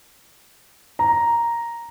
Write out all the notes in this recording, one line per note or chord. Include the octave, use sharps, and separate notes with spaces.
A#5